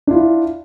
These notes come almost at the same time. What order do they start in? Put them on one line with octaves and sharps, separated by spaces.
D4 F4 E4